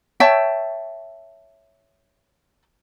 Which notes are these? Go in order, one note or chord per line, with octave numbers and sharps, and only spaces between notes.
C#5 E5 G5 A5